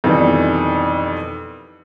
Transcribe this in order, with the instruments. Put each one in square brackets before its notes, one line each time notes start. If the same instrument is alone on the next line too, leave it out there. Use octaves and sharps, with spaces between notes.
[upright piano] F2 B2 D#3 E3 G3